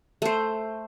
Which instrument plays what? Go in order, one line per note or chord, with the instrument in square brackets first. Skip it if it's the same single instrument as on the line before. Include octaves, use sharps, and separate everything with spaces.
[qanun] A3 C5